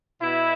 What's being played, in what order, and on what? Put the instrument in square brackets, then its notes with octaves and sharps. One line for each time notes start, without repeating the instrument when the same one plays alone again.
[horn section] B2 E4